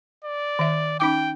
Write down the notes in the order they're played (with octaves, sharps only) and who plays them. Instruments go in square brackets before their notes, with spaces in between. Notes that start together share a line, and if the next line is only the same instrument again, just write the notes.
[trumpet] D5
[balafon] D#3 E5
[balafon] C#4 D#4 D6 [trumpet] G5